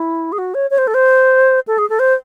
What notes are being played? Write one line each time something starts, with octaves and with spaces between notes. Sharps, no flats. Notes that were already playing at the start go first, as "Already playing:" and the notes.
Already playing: E4
G#4
F#4
C#5
C#5
C5
A4
C5
A4
G#4
A4
C5